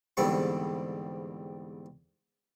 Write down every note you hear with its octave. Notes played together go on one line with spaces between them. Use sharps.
E2 G#2 D3 G3 C4 C#6